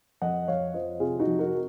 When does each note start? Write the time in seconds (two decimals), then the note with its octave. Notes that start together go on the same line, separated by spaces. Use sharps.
0.21 F2 D#5 F#5
0.48 F2 C#5 F5
0.74 F3 C5 D#5
1.00 C3 F4 G#4
1.19 D#4 F#4
1.27 F2
1.39 F#4 A#4